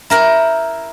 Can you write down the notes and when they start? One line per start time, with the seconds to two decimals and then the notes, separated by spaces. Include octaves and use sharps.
0.10 E4 A#4 G5